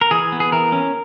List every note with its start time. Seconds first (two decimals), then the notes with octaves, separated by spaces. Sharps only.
0.01 A#4
0.11 E3 G#4
0.32 B3
0.40 G#4
0.52 E3 A#4
0.72 C#4